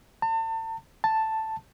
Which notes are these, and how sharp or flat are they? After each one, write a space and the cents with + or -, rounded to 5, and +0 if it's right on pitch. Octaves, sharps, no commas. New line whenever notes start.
A5 +40
A5 +5